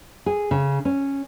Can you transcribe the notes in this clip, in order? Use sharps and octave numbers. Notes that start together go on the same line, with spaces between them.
G#4
C#3
C#4